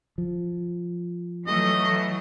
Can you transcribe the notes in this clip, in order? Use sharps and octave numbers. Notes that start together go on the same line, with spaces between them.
F3
E3 F#3 A3 D#5